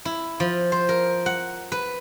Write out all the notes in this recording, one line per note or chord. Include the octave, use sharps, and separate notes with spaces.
E4
F3
C5
A#4
F#5
B4